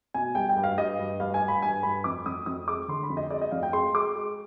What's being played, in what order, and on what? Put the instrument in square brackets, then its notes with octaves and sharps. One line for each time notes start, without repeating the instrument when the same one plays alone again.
[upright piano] B2 G#5
G3 G5
G5
G2
F5
G2 D#5
G2
G2 F5
G#5
G2
B5
G2 G#5
G2 B5
F2 D6
F2 D#6
F2 D#6
G#3 D6
D3 C6
B5
F2
D#5
G#3 D5
D#5
F2 F5
G5
G#3 C6
G#3 D6
G#3